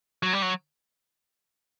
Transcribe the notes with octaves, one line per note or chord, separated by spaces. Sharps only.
F#3
G3
F#3